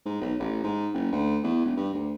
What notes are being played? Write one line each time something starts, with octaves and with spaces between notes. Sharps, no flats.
G#2
B1
A1
G#2
F#1
D2
E2
E1
G2
D2